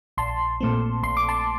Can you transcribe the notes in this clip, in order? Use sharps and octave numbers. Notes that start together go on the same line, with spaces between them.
A#1 A5 C6
A#2 A3 C4
A#1 C6
D6
A5 C6